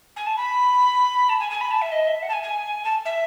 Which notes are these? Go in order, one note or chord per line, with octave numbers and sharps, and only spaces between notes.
G#5
A5
B5
A5
G#5
G#5
B5
A5
E5
D#5
E5
F#5
A5
G#5
G#5
A5
E5